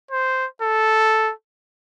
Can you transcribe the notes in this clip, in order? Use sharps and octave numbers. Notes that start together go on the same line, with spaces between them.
C5
A4